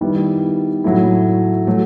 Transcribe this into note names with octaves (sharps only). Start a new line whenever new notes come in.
D#3 G3 B3 E4
A2 F#3 A3 E4
F#3 A3